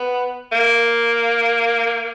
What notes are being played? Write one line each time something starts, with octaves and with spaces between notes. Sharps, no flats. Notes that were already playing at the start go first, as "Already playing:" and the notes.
Already playing: B3
A#3